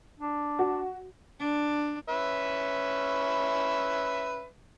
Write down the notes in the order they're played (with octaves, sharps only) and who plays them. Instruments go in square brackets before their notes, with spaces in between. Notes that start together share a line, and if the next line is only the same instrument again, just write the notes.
[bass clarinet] D4
[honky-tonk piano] F#4
[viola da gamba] D4
[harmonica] C#4 B4 E5